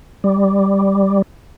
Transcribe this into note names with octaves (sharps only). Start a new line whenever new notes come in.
G3